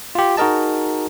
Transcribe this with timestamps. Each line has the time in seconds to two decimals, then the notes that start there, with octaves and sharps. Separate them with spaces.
0.15 F4 G4
0.37 D#4 F#4 G#4 A#4 D#5 A5